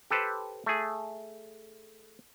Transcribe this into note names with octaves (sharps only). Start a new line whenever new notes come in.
G4 A4 B4 C5
A3 G#4